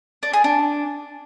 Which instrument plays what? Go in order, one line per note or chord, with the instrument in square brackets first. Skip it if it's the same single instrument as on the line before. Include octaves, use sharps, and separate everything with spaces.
[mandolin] D4
G#4
D4